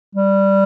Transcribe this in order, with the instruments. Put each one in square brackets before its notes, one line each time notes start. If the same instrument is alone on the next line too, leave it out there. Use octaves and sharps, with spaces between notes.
[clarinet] G3